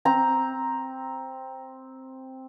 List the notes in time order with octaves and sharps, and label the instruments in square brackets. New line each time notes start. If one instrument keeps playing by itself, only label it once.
[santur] C4 A#5